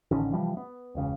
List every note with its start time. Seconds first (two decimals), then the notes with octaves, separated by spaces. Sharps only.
0.11 A1 D3 D#3 C#4
0.33 C3 E3 F3 G3
0.57 B3
0.95 E1 C#2 C#3